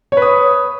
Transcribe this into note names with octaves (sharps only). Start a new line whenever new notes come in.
B4 C#5 D#6